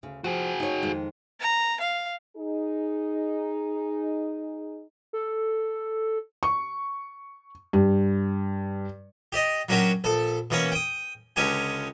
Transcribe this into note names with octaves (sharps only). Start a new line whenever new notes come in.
D2 C#3
F3 F#4 G#4
D#4 C#5
F2 D#3 G#3
A#5
F5
D#4 G#4
A4
C#6
G2
G4 D5 D#5
F#3 A#3 C#4 D4 F#4 G4
A#1 A4 A5
B2 E3 A#3 C#4 C#5
G5 D#6
C#2 D3 G#3 C#4 G4 G#5